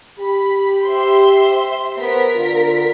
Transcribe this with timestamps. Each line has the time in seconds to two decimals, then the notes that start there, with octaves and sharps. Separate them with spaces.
0.19 G4 B5
0.83 C5 E5 C6
1.98 B3 A#4 C5 B6
2.35 D3 F4